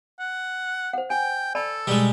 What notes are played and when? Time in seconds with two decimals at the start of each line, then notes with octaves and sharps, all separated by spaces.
0.20 F#5
0.93 C5 F#5
1.10 G5 G#5
1.55 A4 D5 A5 B5
1.87 B2 G3 G#3